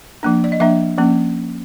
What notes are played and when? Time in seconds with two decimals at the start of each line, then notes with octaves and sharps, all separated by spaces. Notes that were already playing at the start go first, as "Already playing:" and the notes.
0.23 F3 A#3 D4
0.44 D5
0.52 D#5
0.60 F3 A#3 D4 E5
0.98 F3 A#3 C#4